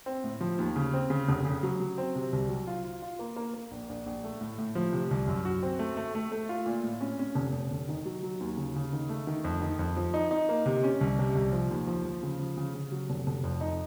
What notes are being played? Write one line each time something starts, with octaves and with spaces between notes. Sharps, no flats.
C4
A2
F3
D#2
C#3
C4
C#3
F1
C#3
F#3
F#3
C4
C3
C2
F#3
F4
F4
F4
A#3
A#3
A#3
A#1
A#1
A#1
A3
A2
A2
F3
C3
C2
F#2
F#4
C4
A3
A3
A3
A3
F4
A#2
A2
C#4
C#4
F1
F1
F1
D#3
F#3
F#3
D#2
C#3
C#3
D#3
A3
D#3
F2
D#3
F2
F3
D#4
D#4
A#3
C3
C#4
C2
C3
C2
F3
D#2
F3
F3
C#3
F3
C#3
C#3
F#3
F1
F1
F2
D#4